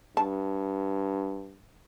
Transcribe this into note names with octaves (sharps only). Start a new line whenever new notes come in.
G2 A5